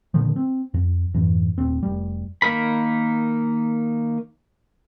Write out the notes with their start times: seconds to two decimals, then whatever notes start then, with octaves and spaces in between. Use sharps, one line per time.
0.14 A#2 D3 D#3 F3
0.36 C4
0.74 F2
1.14 F2 G#2 E3
1.58 D#1 C4
1.83 F1 G3
2.42 D#3 A#3 D#4 A#4 B5